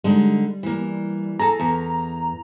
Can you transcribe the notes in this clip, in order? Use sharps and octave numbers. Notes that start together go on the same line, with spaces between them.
D3 G3 G#3 D#4
E3 A#3
G#4 A4 A#5
E2